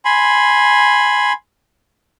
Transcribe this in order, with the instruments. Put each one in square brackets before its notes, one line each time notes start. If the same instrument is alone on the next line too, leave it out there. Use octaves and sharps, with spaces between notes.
[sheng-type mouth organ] G#5 B5 C6